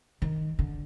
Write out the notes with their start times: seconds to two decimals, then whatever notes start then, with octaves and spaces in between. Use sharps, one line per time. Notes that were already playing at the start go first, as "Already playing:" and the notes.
0.22 D#3
0.59 D3